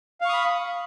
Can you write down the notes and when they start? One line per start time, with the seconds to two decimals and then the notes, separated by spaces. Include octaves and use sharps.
0.21 F5
0.25 C#6
0.29 D#6
0.33 B5